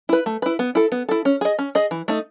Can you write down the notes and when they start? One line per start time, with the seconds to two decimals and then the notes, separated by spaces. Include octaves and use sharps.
0.09 E4 B4
0.26 A3
0.42 E4 B4
0.59 B3
0.75 E4 A4
0.92 B3
1.09 E4 A4
1.25 C#4
1.41 G#4 D#5
1.59 C#4
1.75 G#4 D#5
1.91 E3
2.08 A3 D#4